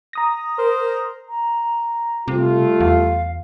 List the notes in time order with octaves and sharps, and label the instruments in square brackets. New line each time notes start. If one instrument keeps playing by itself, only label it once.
[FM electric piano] A#5 D#6 A#6
[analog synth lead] A#4 [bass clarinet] C5
[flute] A#5
[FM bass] C3 [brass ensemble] G3 A3 F4
[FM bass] E2 [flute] F5